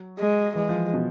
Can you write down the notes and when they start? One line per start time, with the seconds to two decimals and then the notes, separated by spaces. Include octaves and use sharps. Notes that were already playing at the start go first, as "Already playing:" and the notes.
Already playing: F#3
0.19 G#3
0.55 E3 G#3
0.69 F3
0.94 B2